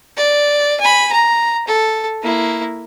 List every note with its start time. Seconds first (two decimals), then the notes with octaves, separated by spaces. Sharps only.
0.17 D5
0.80 G#5 B5
1.12 A#5
1.67 A4
2.22 A#3 E4